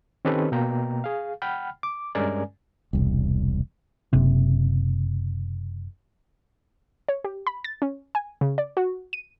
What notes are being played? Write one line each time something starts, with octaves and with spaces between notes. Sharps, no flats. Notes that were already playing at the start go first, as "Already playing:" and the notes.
D#3 C4 C#4 G4 A4 B4
B2 A#3 G5 A#5
G#4 F5
F#5 G5 B5 F6
D6
G2 G#3 C#4 A#4 D5 G#5
E1 C2
F#1 C3
C#5
G4
B5
A6
C#4
G#5
C#3
D5
F#4
D#7